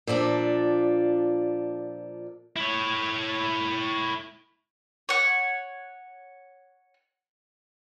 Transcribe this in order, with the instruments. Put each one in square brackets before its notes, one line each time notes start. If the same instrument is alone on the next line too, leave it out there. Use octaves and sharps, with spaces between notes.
[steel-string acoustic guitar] A#2 F3 D4 A4
[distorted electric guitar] E4 C#5
[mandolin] C#5 F#5